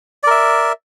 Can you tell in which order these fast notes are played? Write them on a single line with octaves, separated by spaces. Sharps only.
D5 A#4 E5